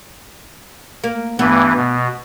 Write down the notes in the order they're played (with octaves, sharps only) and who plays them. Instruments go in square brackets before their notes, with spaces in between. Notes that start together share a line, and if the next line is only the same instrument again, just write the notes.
[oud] A#3
[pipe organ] G2 E3 [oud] B3
[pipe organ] B2